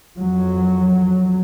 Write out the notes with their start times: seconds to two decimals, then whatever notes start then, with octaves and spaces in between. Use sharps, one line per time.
0.17 F2 F#3